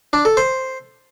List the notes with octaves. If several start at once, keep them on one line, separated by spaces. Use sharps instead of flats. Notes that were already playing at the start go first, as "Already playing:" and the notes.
D4
A4
C5